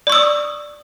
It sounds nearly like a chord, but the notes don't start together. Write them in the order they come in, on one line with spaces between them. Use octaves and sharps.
D5 C#6 E6 D#6